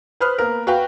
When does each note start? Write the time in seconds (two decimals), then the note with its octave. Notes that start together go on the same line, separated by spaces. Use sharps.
0.20 B4 C5 B5 D#6 F6 F#6
0.38 A#3 B3 A#4
0.67 F#4 B4 F5 G5